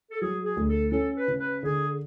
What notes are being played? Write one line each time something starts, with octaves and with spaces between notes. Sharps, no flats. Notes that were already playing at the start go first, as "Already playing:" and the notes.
A4
F#3 G#4
G#4
D2
A4
C#4 A4
B4
C#3
B4
D3 G#4